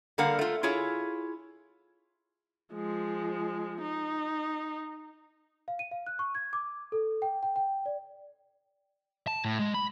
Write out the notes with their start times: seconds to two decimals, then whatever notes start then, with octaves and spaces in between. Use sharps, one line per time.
0.18 D3 G3 A#3 A#4 F5 F#5
0.39 A3 F4
0.63 E4 F4 G#4 C#5
2.74 F3 G#3
3.81 D#4
5.68 F5
5.79 D#7
5.91 F5
6.06 F#6
6.19 C#6
6.35 G#6
6.53 D6
6.92 A4
7.22 G5
7.43 G5
7.56 G5
7.86 D5
9.27 A5
9.45 A2
9.59 G#3
9.74 B5